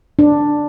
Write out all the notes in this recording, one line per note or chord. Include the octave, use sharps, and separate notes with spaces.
D4